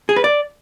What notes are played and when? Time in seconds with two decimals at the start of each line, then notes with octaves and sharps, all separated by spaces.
0.09 G#4
0.16 B4
0.24 D5